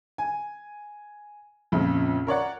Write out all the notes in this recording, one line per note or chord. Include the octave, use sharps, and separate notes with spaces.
G#5
A#1 F2 C#3
A#4 C#5 D5 F#5